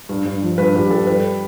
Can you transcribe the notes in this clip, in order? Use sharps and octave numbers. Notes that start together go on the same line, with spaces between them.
G2
G2
F3
G2 B4
G2 G4
G2 A4
G3 B4